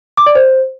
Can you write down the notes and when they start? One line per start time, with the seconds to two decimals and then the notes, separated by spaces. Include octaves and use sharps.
0.17 D6
0.26 D5
0.35 C5